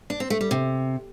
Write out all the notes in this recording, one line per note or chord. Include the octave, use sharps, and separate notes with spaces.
D4
C4
A3
G3
C3